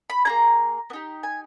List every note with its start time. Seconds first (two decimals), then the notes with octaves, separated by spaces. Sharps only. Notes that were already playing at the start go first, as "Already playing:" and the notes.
0.10 B5
0.25 A#3 E4 G#4 A#5
0.90 B3
0.93 D#4 G4
1.23 G#5